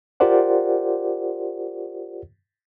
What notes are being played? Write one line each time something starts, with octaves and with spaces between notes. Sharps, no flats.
F4 G4 A#4 C5 D5 F#5